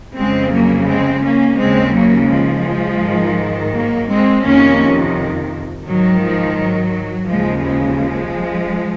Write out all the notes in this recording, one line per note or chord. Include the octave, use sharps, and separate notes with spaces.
F2 C#3 G#3 C4
F#3 A#3
G#3 C4
A#3 C#4
D#2 C#3 G#3 C4
F#3 A#3
F3 G#3
G#2 D#3
F#3 A#3
G#3 C4
F2 C3 D#3 A#3 C#4
G#2 D#3 F#3
F3
F#3
D#2 C#3 F3 G#3
F3 G#3